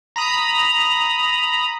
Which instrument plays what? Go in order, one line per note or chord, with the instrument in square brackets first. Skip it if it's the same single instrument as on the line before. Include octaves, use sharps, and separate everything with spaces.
[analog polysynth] A#5 B5 D#6